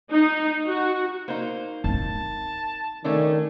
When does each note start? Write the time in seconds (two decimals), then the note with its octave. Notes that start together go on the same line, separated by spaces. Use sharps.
0.10 D#4
0.67 F#4
1.28 A#3 D#4 C5
1.84 C4 A5
3.04 D#3 A3 C#4 D4